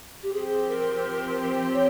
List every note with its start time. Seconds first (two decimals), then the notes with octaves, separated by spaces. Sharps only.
0.22 G4
0.33 F3 C4 G4 G#4
0.68 A#4
1.73 C#5